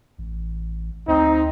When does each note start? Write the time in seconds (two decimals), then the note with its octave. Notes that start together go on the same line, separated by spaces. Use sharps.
0.19 A1
1.08 D2 C4 D#4